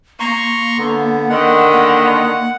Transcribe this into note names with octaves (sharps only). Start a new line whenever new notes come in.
A#3 A#5 C6 C#6
D3 B3
D3 D#3 F#5
A#3